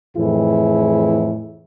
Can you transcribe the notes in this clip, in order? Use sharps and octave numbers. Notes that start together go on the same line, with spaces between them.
F2 A2 E3 E4 G#4